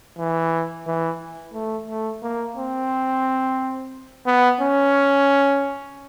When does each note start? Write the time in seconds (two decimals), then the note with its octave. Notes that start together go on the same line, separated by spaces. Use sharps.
0.18 E3
0.87 E3
1.54 A3
1.88 A3
2.23 A#3
2.57 C4
4.26 B3
4.61 C#4